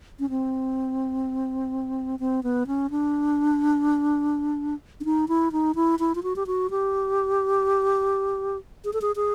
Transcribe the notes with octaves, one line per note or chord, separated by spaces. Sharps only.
C#4
C4
C4
B3
C#4
D4
D4
D#4
E4
D#4
E4
E4
F4
F#4
G4
F#4
G4
G#4
A4
G#4
G#4